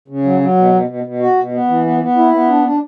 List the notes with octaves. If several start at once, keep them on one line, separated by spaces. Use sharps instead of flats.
C#3
F#3
F#3
B2
B2
B2
B2
F#4
B2
B3
E3
B3
B3
E4
B3
D4
D4